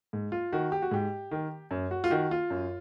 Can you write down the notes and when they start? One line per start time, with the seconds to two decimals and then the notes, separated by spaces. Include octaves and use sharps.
0.13 G#2
0.32 F4
0.52 D#3 F#4
0.72 G4
0.82 F#4
0.91 G#2 G4
1.31 D#3
1.71 F#2
1.91 F#4
2.04 F4
2.10 D#3 F#4
2.31 F4
2.50 F#2